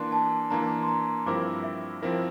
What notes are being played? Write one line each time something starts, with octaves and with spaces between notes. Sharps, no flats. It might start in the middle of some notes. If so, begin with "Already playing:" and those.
Already playing: E3 A#3 D4 C6
A5
E3 A#3 D4 A#5
C6
A#5
G2 F3 C4 E4 A#4 D6
E5
F3 C4 E4 A#4 E5